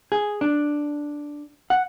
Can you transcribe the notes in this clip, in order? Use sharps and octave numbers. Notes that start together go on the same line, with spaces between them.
G#4
D4
F#5